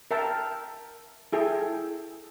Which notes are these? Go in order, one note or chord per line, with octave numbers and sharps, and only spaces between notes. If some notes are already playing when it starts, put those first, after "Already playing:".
A#4 E5 G5 A5
E4 G#4 A4 G5